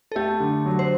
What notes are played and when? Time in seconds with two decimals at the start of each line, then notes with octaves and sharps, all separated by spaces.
0.12 A4
0.16 A3 G4
0.40 D3
0.66 F#3
0.79 C5